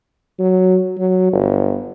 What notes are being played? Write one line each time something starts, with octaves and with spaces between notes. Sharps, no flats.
F#3
F#3
G1